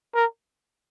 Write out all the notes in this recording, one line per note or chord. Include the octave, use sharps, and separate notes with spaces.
A#4